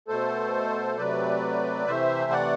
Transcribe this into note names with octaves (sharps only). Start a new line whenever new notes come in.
B2 A3 A4 C5
C3 F#3 A3 B4 D5
C3 E3 A3 C5 E5
D5 F#5